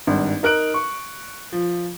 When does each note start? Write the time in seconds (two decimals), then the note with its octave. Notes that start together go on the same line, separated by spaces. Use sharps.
0.07 G#1 G2
0.43 D#4 A#4 F#6 D7 F#7
0.74 C#6
1.52 F3